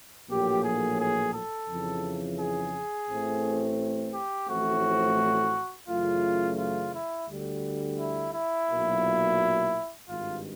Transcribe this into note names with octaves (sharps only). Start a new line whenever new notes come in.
A#1 A2 F#3 A#3 G4
G#4
G#4
A4
F2 C#3 E3
G#4
A1 A2 E3 A3 C4
G4
A1 A2 F3 A3 C4 F#4
F#2 C#3 E3 A3 F4
F4
E4
D2 D3 G3
E4
E4
B1 A#2 F#3 A#3
G#1 G2 D#3 F4